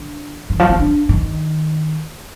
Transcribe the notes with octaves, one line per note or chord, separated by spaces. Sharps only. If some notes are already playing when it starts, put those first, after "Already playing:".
Already playing: D3
D#3
F3
C4
D4
D#3